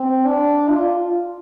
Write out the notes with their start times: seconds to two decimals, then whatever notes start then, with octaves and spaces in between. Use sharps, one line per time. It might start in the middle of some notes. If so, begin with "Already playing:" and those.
Already playing: C4
0.26 D4
0.70 F4
0.99 F4